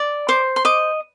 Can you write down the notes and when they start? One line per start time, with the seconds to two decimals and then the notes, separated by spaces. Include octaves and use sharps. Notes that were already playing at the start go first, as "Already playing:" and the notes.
Already playing: D5
0.29 C5 D6
0.56 C6
0.65 D#5 D6